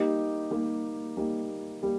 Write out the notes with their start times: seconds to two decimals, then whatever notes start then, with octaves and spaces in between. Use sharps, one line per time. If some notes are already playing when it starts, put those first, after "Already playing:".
Already playing: G3 A#3 D#4 G4
0.51 G3 A#3 D#4 G4
1.17 G3 A#3 D#4 G4
1.83 G3 A#3